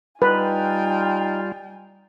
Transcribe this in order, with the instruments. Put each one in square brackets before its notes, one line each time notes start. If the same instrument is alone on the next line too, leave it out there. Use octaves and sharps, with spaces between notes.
[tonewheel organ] G3 F4 [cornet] D#4 [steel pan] B4 [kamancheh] G5 G#5